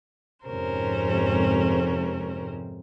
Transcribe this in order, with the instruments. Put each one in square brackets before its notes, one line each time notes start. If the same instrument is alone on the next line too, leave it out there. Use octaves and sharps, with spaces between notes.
[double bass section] F2 G#2 C3 [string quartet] C#4 A#4 C5